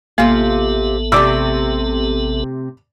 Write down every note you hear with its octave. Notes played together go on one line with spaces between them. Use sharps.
A1 C3 A#3 B3 F4 A4
C3 A3 D5 D6 E6